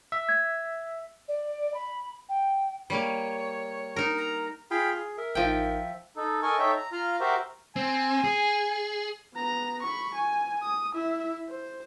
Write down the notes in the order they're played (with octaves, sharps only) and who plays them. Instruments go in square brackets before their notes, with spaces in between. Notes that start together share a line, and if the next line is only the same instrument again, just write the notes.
[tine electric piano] E5
[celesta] G#6
[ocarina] D5
B5
G5
[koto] G3 A#3 [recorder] C#5
[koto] D#4 A#4
[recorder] A#5
[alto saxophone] F4 [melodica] G#4 G5 B5
[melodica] G#4
[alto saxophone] A#4 [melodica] E5
[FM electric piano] A1 D#4 [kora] F3 G5
[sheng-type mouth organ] D#4 A4
A4 A#4 D#5 G#5 C#6
D#4 A4 C#5 E5 G5
A#5
F4 F5 A#5 F6
F#4 G4 A#4 C5 E5 A#5
[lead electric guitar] C4 [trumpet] G#5
[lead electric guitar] G#4
[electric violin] B3 A#5
B5 C#6
G#5
D#6
E4 E5
C5